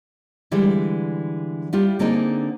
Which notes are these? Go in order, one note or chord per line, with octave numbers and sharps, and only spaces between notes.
D3 E3 G3 G#3 E4
G3 E4 F4 G4
D3 A#3 C4 D4 D#4 G#4